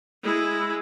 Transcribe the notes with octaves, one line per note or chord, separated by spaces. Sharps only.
G#3 E4